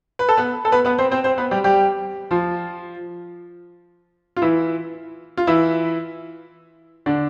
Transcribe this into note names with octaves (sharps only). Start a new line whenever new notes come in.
B4
A4
B3 B4
A4
B3 B4
B3 B4
C4 C5
C4 C5
C4 C5
B3 B4
G3 G4
G3 G4
F3 F4
F4
E3 E4
F4
E3 E4
D3 D4